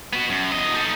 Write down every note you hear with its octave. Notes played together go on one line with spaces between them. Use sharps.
B3 F#4
F#2
E2 D#5
D#4 A4